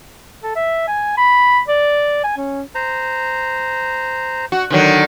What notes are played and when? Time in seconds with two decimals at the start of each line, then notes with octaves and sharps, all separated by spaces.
0.43 A4
0.56 E5
0.88 G#5
1.18 B5
1.68 D5
2.24 G#5
2.37 C#4
2.75 C5 A#5
4.52 F#4
4.70 D3 D#3 F#3